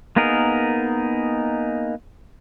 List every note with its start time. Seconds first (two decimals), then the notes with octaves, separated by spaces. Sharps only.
0.16 A#3 B3 D#4 G#4 A#4